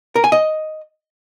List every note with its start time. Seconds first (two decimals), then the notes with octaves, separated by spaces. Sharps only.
0.15 A#4
0.24 G#5
0.32 D#5